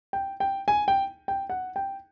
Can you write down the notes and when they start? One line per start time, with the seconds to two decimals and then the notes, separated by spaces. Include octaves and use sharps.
0.13 G5
0.40 G5
0.68 G#5
0.88 G5
1.28 G5
1.50 F#5
1.76 G5